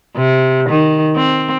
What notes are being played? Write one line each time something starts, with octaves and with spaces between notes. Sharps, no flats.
C3
D#3
C4